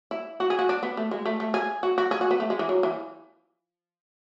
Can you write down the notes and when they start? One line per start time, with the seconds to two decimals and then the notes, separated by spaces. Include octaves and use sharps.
0.11 E4
0.40 F#4
0.50 G#4
0.59 F#4
0.69 D4
0.83 B3
0.97 A3
1.11 G#3
1.26 A3
1.40 A3
1.54 G#4
1.83 F#4
1.98 F#4
2.11 G#4
2.21 F#4
2.31 B3
2.40 A3
2.50 G#3
2.59 E3
2.69 F#3
2.83 E3